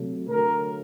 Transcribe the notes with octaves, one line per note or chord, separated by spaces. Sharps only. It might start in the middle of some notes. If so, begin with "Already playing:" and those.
Already playing: C3 F#3 A3
D3 F#3 A3 A#4